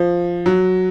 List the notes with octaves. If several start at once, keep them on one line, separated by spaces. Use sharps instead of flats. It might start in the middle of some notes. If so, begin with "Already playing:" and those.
Already playing: F3
F#3